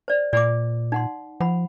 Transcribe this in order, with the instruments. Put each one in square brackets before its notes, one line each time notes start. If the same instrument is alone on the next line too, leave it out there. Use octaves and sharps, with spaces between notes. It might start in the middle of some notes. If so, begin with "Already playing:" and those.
[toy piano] C5 D5
[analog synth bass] A#2 [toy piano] D5 D6
[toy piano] D#4 F#5 C6
[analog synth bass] F3 [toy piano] F#5 B5